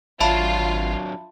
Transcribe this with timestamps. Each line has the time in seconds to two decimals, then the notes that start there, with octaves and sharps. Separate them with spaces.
0.20 G#1 F#3 D4 F4 C#5 E5 A5 B5